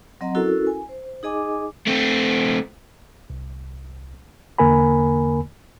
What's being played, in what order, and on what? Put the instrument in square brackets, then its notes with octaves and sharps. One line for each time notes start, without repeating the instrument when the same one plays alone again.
[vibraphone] F#3 C4 D#5 F#5 A#5
C#4 E4 F#4 A4 A#4
G#5
C5
D#4 G#4 D#5 G#5 D6
[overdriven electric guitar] A3 C4
[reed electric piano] C2
E2 D3 A#3 A#4 G#5 B5